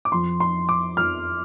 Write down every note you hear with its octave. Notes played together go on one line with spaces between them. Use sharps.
D6
F2 F3 C6
C6
D6
F2 F3 F6